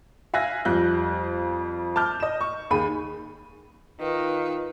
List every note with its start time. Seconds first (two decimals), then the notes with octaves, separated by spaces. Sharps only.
0.34 E5 F5 G#5 F#6 A#6
0.65 F2 G3 F4 F#6 G6
1.96 A5 D6 F6 G6
2.20 D#5 E7
2.41 C#6
2.70 D#2 G#4 B5 D#7
4.00 D#3 F4 B4